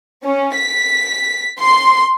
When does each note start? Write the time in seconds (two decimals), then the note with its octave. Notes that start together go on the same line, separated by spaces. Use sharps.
0.22 C#4
0.55 B6
1.59 C6